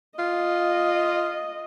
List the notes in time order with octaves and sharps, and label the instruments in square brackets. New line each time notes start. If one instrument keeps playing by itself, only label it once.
[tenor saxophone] F4 [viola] D#5